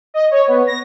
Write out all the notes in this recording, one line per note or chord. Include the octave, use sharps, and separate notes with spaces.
D#5
C#5
B3
A#6